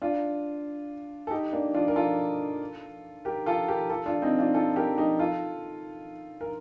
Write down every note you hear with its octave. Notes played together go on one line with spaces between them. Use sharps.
D4 F4
A4
D#4 G4
A#3 D4
D4 F4
A#4
F4 A4
G4 A#4
F4 A4
G4 A#4
F4 A4
D4 F4
C4 D#4
D4 F4
F4 A4
G4 A#4
D#4 G4
F4 A4
A#4